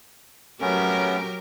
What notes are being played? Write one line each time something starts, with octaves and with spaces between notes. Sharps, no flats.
F#3 A3 B3 C#4 G4 A#4